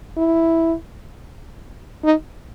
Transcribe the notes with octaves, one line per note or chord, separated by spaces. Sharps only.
E4
D#4